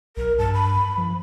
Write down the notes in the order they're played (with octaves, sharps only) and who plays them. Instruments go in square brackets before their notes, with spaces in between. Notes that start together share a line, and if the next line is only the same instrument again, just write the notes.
[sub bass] B1 [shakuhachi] A#4
[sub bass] G2 [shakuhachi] A5
[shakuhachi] B5
[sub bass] F3